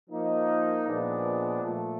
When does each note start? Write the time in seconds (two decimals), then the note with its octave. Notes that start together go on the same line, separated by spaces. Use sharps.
0.10 F3 A#3 D#4
0.85 A#2 F3 G#3 B3 D4
1.62 A#2 F3 A3